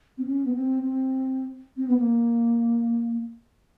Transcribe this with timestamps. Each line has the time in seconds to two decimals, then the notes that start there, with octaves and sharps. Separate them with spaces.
0.18 C4
0.26 C#4
0.45 B3
0.54 C4
0.82 C4
1.77 C4
1.87 B3
1.97 A#3